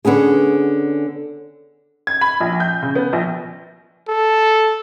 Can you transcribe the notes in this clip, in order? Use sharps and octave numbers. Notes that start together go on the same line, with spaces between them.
D3 B3 C#4 G#4
G#6
B5
A#1
G6
C#3
B3
A#1
A4